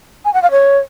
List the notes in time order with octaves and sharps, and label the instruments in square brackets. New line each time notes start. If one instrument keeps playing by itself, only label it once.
[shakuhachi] G#5
F#5
F5
C#5